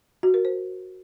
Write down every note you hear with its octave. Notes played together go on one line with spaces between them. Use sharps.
F#4
A#4
C5